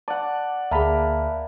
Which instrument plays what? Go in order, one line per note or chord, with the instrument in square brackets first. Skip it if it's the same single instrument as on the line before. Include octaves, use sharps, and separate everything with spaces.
[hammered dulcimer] D5 F#5 [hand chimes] A5
[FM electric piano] D2 G#4 [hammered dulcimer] A#3 [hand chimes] E5 A5 B5